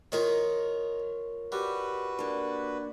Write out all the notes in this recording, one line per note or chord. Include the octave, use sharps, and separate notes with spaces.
D#3 D#4 F4 G#4 A#4 C#5
G3 F#4 B4
A#3 D4